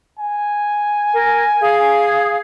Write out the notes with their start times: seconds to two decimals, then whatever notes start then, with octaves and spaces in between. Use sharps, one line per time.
0.19 G#5
1.13 A#4
1.61 G#4 F5